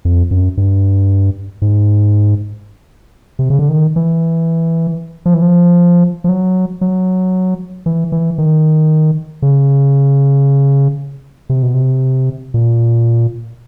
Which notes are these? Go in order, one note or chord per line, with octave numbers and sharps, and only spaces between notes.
F2
F#2
G2
G#2
C3
C#3
D3
D#3
E3
F3
E3
F3
F3
F#3
F#3
E3
E3
D#3
C#3
C3
B2
C3
A#2